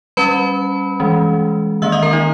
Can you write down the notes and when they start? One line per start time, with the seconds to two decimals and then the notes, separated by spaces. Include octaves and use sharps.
0.17 G3 C#4 B4 B5
1.00 E3 G#3 C#4
1.82 D#3 A#3 C#4 E5 E6
1.92 D#5 D#6
2.03 A#4 A#5
2.13 D#4 D#5